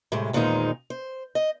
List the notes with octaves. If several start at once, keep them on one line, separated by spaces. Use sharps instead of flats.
A2 C3 G3 G#3
E2 A#2 D#3 G#3 D#4 C5
C5
D#5